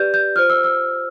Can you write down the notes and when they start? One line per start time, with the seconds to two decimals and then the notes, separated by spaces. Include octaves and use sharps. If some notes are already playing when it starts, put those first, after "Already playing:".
Already playing: G4 B4 D5 G6
0.14 G6
0.35 F4 C5 F6
0.50 E6
0.64 E6